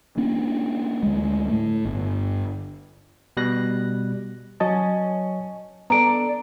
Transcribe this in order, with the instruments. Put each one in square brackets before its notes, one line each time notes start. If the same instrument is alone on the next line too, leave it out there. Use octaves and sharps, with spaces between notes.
[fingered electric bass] A#3 C#4 D4
D2 G#3
A2 A3
G1
[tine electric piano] B2 G3 F#6 A#6
[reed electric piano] F#3 D#5 A5 [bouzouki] C#4
[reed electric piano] B3 [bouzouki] D4 A4 D5 [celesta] A#5 D7